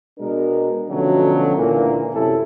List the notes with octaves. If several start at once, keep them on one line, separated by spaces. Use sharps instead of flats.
B2 G#3 D4 A#4
B2 D3 F3 F#3 A3 C#4
C#2 A#2 D3 E3 A#3
A1 F#2 C3 C#4 E4 A4